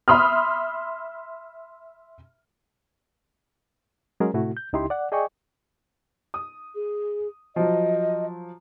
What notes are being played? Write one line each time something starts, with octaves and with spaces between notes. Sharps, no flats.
E5 B5 C6 D#6 F6
F#3 G#3 C#4 G#4 A#4
A2 C3 A3 E4 F#4
G6
C#2 C#3 D#4 E4 G4 C6
D5 F#5
G#4 D5 D#5 G5 G#5 C#6
D#6
G#4
F3 F#3 D#5